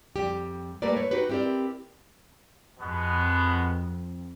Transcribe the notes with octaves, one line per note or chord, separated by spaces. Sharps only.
F2 G3 G4
G3 A3 A#3 A#4 B4 D5
B4 C#5
D#4 F#4 G4 B4
C4 E4 G4 A#4 D5
F2 B2 G#3 B3